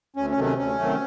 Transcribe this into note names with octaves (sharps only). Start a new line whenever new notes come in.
D2 C#4
C#4
C3 D#3 F#3 A3
C#4
D2 C#4
C3 D#3 F#3 A3